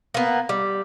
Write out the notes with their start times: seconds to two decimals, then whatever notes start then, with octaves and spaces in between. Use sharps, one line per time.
0.14 A#3 B3
0.49 G3